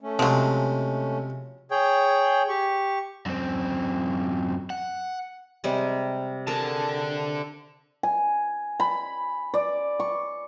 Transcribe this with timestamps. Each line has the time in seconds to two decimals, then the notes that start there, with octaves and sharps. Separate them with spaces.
0.01 A3 C#4
0.19 C3 F3 F#3 G#3
1.71 G#4 C#5 G5
2.49 G4 C#6
3.26 F#2 C4
4.70 F#5
5.64 C3 G3 G#3
6.47 D3 G#4 A#4 A5
8.03 G#5
8.80 B5
9.54 D5
10.00 C#6